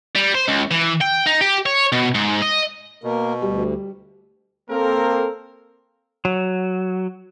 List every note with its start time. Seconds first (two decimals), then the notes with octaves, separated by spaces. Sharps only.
0.16 G3
0.35 C5
0.48 C#2
0.71 E3
1.01 G5
1.26 D#4
1.41 G4
1.66 C#5
1.92 B2
2.15 G#2
2.42 D#5
3.04 B2 A#3 A#4
3.42 D2 G3
4.70 A#3 C4 A4 A#4
6.25 F#3